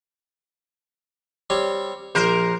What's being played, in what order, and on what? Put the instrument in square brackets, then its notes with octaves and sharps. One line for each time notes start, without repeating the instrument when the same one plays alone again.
[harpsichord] G3 C4 C#5
[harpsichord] A#1 [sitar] A#4 C5